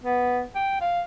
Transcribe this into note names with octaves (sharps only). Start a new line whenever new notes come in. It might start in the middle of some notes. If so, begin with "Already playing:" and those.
B3
G5
F5